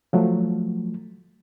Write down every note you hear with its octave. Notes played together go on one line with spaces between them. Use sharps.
F3 F#3 A3